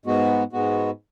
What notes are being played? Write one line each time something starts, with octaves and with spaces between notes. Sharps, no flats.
G#2 G#3 B3 F#4
G#2 G#3 B3 F#4